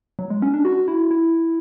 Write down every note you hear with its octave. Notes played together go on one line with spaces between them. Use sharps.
F#3
G#3
C#4
D4
F#4
E4
E4